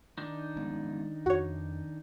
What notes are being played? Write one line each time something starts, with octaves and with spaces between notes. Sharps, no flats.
D#3 D4 D#4
G#3 B3 C#4
F2 F#4 C#5